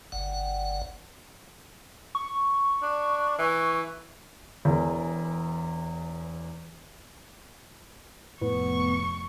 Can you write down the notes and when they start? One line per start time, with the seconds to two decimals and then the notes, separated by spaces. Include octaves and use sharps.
0.12 G1 F#5
2.15 C#6
2.82 D4
3.39 E3
4.65 E1 E2
8.42 F1 A2 B3 C#6